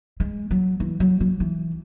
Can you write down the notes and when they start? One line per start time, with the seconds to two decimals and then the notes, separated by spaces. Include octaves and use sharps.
0.20 G#3
0.51 F#3
0.80 E3
1.00 F#3
1.21 F#3
1.40 E3